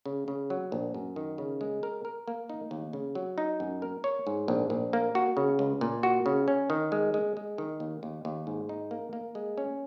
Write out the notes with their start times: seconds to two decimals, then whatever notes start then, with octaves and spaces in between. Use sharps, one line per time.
0.06 C#3
0.28 C#3
0.50 F#3
0.72 A#1
0.94 F#2
1.16 D#3
1.38 C#3
1.61 G#3
1.83 A#4
2.05 A#4
2.28 A#3
2.49 D#4
2.71 D#2
2.93 C#3
3.15 F#3
3.38 D#4
3.60 F#2
3.82 A#4
4.04 C#5
4.27 G#2
4.48 A#1
4.70 A#1
4.93 A#3
5.15 F#4
5.37 C#3
5.59 C#2
5.81 A#2
6.03 F#4
6.26 C#3
6.48 C#4
6.70 D#3
6.92 G#3
7.14 G#3
7.37 G#3
7.58 D#3
7.80 D#2
8.03 D#2
8.25 D#2
8.47 G#2
8.69 D#4
8.91 A#3
9.13 A#3
9.35 G#3
9.58 C#4